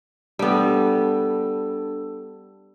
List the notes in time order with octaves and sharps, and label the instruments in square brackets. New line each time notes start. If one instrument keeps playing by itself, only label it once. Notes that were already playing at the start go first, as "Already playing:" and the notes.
[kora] G3 B3 [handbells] D4 A4